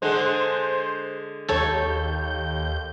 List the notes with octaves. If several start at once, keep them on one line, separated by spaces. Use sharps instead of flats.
D3 G#3 C5
D#2 A4 C#5 G6